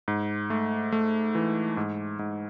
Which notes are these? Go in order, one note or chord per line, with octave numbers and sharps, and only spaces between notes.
G#2
A3
A3
E3
G#2
G#2